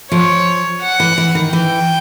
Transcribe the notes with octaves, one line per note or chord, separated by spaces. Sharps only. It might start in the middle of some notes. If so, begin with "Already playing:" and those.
F3 C#5
F#5
E3
E3
D#3
E3 G5